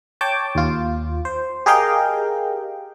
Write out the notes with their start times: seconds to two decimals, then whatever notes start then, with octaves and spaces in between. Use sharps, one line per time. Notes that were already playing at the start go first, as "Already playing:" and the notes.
0.21 C#5 G5 A5 D6
0.55 D#2 F4
1.25 C5
1.66 G4 G#4 A#4 D#5 F5 G5